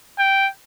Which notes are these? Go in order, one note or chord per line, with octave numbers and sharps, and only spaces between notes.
G5